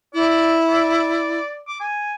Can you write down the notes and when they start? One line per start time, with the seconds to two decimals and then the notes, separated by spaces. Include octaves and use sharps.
0.14 E4 D5
0.68 D5
1.68 D6
1.81 G#5